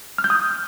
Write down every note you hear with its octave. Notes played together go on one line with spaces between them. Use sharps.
F6
G6
D#6